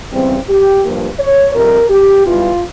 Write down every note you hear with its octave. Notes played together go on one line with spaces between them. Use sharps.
E2 C#3 G3 C4
G4
G2 F3 A#3
C#5
F2 C3 G3 A#4
G4
E2 E3 G3 F4